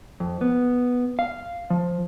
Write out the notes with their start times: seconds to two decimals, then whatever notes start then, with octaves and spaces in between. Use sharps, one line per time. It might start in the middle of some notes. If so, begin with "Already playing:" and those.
0.20 F2
0.41 B3
1.19 F5
1.70 F3